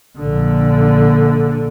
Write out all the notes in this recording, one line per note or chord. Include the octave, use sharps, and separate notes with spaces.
A#1 D3